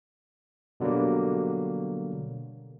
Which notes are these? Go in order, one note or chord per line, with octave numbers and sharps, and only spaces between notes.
B2 D3 F#3 G3 A#3